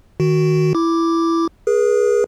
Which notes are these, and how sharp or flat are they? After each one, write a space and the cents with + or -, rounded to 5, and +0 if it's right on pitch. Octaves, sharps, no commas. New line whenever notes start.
D#3 +0 F#4 +0
E4 +10 D6 +0
G#4 +0 B4 -40